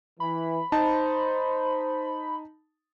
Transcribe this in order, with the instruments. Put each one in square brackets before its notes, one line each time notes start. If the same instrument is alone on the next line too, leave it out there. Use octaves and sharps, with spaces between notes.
[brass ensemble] E3 [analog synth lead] B5
[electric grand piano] D#4 A5 [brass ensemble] C5